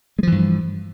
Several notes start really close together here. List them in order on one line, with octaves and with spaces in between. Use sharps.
G#3 F3 E3 G2